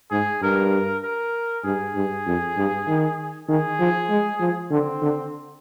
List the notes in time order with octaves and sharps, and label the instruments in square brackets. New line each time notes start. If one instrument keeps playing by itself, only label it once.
[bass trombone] G#2 [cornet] G#4
[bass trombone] G2 [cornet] A#4
[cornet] A#4
[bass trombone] G2 [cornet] G#4
[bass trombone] G2
F2
G2
D#3
[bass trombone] D#3 [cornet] G#4
[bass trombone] F3
G#3
F3
[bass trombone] D3 [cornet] C4
[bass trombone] D3